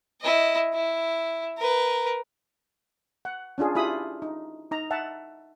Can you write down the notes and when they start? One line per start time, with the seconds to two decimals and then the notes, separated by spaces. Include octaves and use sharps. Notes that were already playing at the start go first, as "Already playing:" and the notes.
0.22 E4 D#5
0.73 E4
1.57 A#4 B4
3.25 F#5
3.58 C#4 D4 F4 G#4
3.75 E4 F4 G4 G#4 B5 D#6
4.22 D#4
4.71 D#4 A#5
4.91 E5 F#5 A5